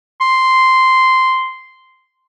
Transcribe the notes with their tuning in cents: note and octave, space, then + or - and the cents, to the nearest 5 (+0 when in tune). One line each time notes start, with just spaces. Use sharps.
C6 -5